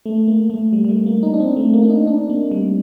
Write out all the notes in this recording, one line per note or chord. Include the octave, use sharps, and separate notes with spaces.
A3
A#3
A3
G3
G3
A3
A#3
D#4
D4
C4
A3
A#3
D4
D#4
D4
A#3
G3